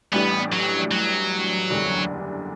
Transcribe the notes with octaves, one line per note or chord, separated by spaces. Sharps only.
A1 A2 E3 G3 B3 D4
F#3
F#3
F#1 E2 D3 G3 D4